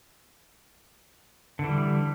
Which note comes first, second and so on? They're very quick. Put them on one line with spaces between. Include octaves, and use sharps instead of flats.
D3 E3 G3